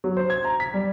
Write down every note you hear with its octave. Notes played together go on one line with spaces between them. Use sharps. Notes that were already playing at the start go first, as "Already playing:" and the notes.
F#3
C5
G#6
A#5
B6
G3